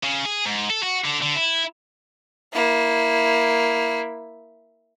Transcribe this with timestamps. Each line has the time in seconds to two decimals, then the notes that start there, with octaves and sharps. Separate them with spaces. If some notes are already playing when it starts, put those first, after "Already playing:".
0.03 C#3
0.25 G#4
0.46 G#2
0.70 A4
0.83 F#4
1.04 D3
1.22 D3
1.35 E4
2.53 A#3 E4